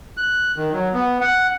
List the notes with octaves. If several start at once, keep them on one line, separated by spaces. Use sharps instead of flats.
F#6
D#3
F#3
B3
F#5